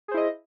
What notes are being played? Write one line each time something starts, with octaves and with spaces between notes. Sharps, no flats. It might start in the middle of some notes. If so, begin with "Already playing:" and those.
E4 G#4 C5 D#5